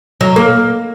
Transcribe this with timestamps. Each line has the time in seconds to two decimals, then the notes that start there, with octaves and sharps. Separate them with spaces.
0.21 F#3
0.36 A#3